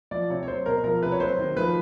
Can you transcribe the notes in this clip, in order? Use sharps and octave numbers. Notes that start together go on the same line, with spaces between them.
F3 D5
C3 C#5
C#5
F#3 C5
B2 A#4
F3 A#4
C3 B4
C#5
F#3 C5
D#3
F3 B4